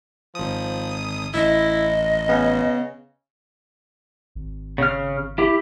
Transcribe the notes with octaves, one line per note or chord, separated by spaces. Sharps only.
G#1 F3 D#6
A1 E4 D#5
C#3 B3
G#1
C#3 F6
E4 G4